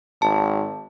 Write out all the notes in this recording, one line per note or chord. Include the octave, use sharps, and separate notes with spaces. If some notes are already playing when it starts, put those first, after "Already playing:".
G#1 A5